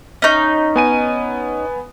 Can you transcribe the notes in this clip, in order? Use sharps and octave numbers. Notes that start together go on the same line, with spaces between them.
C#4 D#4
B3 G#5 D#7